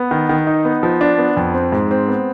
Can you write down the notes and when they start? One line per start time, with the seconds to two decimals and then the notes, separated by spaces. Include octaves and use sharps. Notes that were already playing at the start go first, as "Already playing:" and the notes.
Already playing: B3
0.11 D#3
0.29 D#3
0.47 D#4
0.65 B3
0.83 F3
1.01 D4
1.18 B3
1.37 F2
1.54 C4
1.72 G#2
1.91 C4
2.08 B3